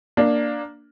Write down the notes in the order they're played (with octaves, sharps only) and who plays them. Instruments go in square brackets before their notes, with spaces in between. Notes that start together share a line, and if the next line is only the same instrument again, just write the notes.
[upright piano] A#3 D4